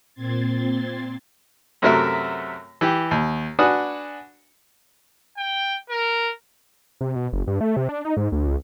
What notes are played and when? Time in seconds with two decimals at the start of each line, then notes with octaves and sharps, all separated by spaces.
0.14 A#2 C4 C6 G#6 A6
1.82 F#2 C3 A3 F#4 A#4 E5
2.81 E3 G4
3.11 D#2
3.59 D4 F#4 B4 F#5 G#5 D#6
5.37 G5
5.90 A#4
7.01 C3
7.16 B2
7.33 F#1
7.47 G2
7.61 A3
7.77 C3
7.89 D4
8.05 D#4
8.17 G#2
8.32 D2
8.47 C#2